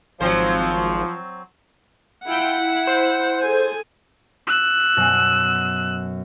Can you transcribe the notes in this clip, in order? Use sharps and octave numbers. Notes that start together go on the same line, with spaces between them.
G#1 F3 F#3 C4 C5
E4 F4 F#5 G5
E4
C5
G#4 A4 G#5
E6 F#6
F#2 B2